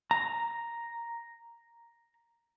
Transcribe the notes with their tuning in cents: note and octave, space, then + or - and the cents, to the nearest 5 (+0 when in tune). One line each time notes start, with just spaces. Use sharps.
A#5 +0